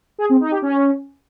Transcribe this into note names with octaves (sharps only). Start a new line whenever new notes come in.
G#4
C4
D#4
G4
C#4